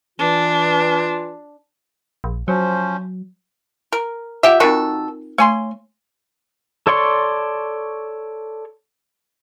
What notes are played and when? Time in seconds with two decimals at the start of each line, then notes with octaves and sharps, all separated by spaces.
0.19 E3 D4 F4
2.24 A#1
2.48 F3 F#3 C#4 C5
3.93 A#4
4.43 F4 G4 E5 F#5
4.60 D#3 C4 D#4 F#4 A4 A#4
5.38 A3 C#5 G#5 C6
6.87 A4 C#5 D5 C6 C#6